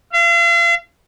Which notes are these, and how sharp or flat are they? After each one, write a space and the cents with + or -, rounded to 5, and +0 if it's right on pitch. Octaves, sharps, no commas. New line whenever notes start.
F5 -40